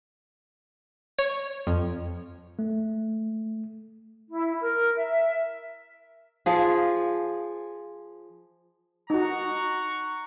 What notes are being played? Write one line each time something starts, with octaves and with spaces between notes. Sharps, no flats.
C#5
F2
A3
E4
A#4
E5
F3 G#4
D#4 F#4 F#5 A#5 C#6